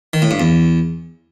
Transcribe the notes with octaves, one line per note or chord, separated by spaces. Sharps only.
D#3
A2
G2
E2